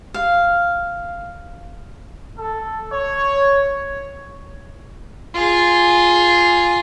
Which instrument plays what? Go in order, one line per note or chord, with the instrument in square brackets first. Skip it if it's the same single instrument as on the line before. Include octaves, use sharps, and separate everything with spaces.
[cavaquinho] F5
[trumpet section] A4
C#5
[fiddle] F4 G#4